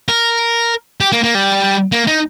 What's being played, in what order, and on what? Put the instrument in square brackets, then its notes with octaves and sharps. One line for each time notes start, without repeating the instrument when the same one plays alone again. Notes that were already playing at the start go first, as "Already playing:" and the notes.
[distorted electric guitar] A#4
G4
A#3
A#3
G3
A#3
D#4